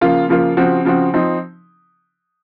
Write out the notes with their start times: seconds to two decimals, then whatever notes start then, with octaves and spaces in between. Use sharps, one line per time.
0.01 C#3 F3 A#3 F4
0.29 C#3 F3 A#3 F4
0.57 C#3 F3 C4 F#4
0.85 C#3 F3 C4 F#4
1.14 F3 C4 D#4